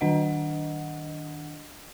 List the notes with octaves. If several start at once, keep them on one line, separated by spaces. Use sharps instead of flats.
D#3 D4 D#5 F#5